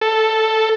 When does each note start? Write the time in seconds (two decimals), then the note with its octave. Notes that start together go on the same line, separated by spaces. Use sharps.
0.01 A4